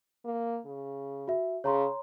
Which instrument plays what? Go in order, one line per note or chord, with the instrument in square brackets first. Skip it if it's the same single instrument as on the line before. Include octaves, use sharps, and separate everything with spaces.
[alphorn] A#3
C#3
[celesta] F#4 E5
[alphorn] C#3 [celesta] C#5 A#5 C6